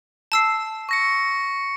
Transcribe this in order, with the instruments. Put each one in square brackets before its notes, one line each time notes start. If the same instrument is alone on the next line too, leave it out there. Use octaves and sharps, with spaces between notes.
[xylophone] A5 E6 C7
[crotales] C#6 A#6 C#7